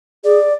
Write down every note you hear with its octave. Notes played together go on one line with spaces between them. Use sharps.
G#4 D5